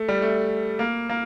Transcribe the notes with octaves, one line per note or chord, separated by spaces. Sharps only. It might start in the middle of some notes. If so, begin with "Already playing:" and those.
Already playing: A3
G3
A3
A#3
A#3